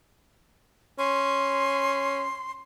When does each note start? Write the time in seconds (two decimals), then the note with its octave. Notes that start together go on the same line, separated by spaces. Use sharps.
0.99 C#4 C6